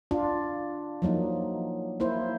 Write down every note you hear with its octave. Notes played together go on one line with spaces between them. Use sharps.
D4 F4
F3 F#3 A#3 D#4
A#3 E4 C5